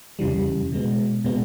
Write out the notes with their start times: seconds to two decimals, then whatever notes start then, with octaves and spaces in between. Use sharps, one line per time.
0.19 E2 C#3 E3 G3
0.72 B2 G#3 B3
1.24 B2 G#3 B3